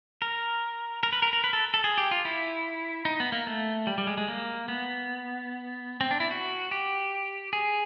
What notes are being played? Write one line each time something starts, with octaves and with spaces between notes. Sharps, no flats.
A#4
A#4
B4
A#4
A#4
B4
A4
A4
G#4
G4
F4
E4
D#4
B3
A#3
A3
G3
G3
G#3
G#3
A#3
B3
C4
D4
E4
F#4
G4
G#4